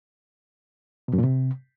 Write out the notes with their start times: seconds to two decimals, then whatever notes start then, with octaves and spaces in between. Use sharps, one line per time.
1.08 B2
1.13 F#2
1.18 A#2
1.24 C3